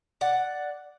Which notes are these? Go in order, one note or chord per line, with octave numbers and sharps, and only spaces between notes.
D5 F#5